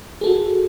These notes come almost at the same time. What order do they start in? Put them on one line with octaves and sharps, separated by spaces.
G#4 A4 F#4